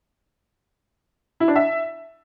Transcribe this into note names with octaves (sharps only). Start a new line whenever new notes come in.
E4
D4
E5